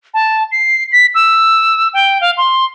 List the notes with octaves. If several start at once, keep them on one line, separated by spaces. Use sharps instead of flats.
A5
C7
B6
E6
G5
F5
C6